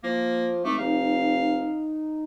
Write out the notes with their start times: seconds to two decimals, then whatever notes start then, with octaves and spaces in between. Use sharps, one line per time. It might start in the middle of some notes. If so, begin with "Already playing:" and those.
0.04 F3 A#3
0.64 G#1 A3 D6
0.79 F1 D#4 F5